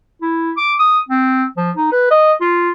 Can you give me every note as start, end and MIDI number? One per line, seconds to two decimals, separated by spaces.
0.22 0.52 64
0.57 0.74 86
0.79 0.99 87
1.09 1.44 60
1.57 1.71 53
1.77 1.88 63
1.92 2.07 71
2.11 2.34 75
2.41 2.71 65